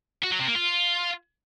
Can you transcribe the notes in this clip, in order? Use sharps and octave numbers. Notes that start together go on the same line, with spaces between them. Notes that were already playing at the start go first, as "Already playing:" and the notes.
F#4
F#3
C3
A#3
F4